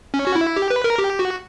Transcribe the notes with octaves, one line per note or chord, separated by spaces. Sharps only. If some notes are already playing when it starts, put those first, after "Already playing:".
C#4
F#4
E4
G4
B4
A#4
G4
F#4